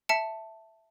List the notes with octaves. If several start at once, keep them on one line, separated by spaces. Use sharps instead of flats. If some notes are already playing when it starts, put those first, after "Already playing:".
E5 A5 C#7